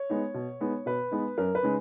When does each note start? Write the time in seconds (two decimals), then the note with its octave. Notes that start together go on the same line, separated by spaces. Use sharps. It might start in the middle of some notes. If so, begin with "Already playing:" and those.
Already playing: C#5
0.10 G#3 B3 D#4
0.34 B2
0.61 G#3 B3 D#4
0.86 B2 B4
1.11 G#3 B3 D#4
1.38 F#2 A#4
1.55 B4
1.63 C#3 G#3 D#4